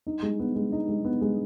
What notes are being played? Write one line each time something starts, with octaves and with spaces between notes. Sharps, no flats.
D#4
G#3
B3
G#3
D#4
G#3
B3
G#3